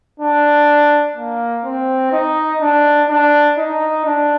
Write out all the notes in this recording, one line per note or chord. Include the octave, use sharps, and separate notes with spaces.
D4
A#3
C4
D#4
D4
D4
D#4
D4